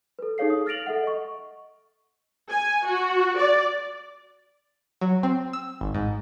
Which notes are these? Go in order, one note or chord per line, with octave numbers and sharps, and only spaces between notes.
A4 B4
D#4 G#4 A4 C#5 F5 C7
D#6
F6 A6 A#6 D7 F7 F#7
A4 E5 F#5
D#5 C#6
G#5
F#4
D5
F#3
C4
E6
G#1
G#2